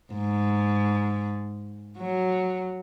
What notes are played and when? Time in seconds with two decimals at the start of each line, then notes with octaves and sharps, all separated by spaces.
0.14 G#2
1.98 F#3